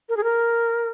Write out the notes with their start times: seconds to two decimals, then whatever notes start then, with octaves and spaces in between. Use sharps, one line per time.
0.09 A#4
0.17 G#4
0.24 A#4